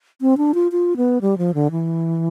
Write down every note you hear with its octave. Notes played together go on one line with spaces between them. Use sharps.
C4
D4
F4
F4
B3
G3
F3
D3
E3